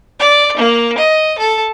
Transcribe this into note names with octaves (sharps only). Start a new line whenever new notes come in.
D5
A#3
D#5
A4